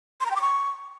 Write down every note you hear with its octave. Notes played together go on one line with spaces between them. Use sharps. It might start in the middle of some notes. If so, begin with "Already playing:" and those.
C6
A#5
G5
D6
C#6